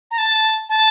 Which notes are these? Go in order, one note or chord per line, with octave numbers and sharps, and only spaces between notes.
A#5
A5
A5